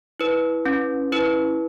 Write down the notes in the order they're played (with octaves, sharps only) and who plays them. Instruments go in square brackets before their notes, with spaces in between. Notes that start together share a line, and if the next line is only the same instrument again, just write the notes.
[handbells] E4 B4
C#4
E4 B4